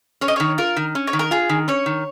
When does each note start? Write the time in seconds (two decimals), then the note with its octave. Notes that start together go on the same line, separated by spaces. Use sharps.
0.21 C#4 C#5
0.28 D#5
0.36 D#3 C#5
0.58 F4 A#4
0.76 D#3
0.95 C#4
1.07 C#5
1.13 D#3
1.19 A#4
1.31 F4 G#4
1.49 D#3
1.68 C#4 C#5
1.86 D#3